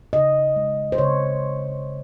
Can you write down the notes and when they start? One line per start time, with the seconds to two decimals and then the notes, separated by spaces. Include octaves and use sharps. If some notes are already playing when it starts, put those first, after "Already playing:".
0.13 C#3 D#5
0.56 G#3
0.92 C5
0.98 C#3 C#5